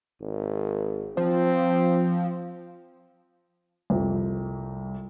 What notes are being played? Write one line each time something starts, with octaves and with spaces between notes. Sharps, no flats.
G#1
F3 C4
C2 F2